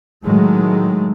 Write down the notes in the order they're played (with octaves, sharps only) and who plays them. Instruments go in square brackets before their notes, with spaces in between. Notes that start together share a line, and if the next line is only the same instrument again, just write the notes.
[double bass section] A2 D#3 F#3 G#3 A3